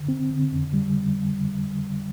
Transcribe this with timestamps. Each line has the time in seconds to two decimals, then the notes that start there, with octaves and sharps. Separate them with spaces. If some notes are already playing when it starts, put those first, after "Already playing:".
Already playing: D3
0.09 C4
0.31 D3
0.52 F2
0.74 G3